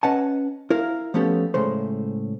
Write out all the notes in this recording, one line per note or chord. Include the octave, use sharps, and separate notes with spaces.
C#4 B4 D#5 F#5 G#5 A5
E4 A#4 F5
F3 A3 B3 C#4 G4 A4
A2 C#3 G#3 A3 C5